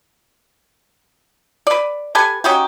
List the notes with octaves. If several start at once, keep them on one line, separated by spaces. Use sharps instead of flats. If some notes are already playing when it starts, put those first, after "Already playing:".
B4 D5
G4 A4 B4 G#5
C#4 D#4 F#4 G4